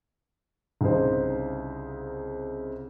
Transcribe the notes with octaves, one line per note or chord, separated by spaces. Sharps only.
C2 C#3 D#4 C5